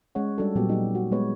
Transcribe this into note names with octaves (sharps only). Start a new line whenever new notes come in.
G#3 C#4 C#5 F#5
G3 D4 F#4 G#4 A4
A#2 F#3 G3 B3 G4
D#4 G4
F#4
G#3 B3 B4 C#5